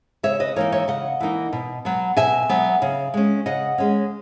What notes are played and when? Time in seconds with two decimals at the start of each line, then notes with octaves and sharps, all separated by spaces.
0.23 C#3 C#5 E5
0.40 B4 D#5
0.56 E3 A#3 D#4 A#4 C#5
0.72 C#5 E5
0.88 C#3 D#5 F#5
1.20 E3 A#3 D#4
1.53 B2
1.85 F#3 B3
2.17 B2 E5 G#5
2.49 F#3 B3
2.82 C#3
3.14 G#3 C#4
3.46 C#3 D#5 F#5
3.78 G#3 C#4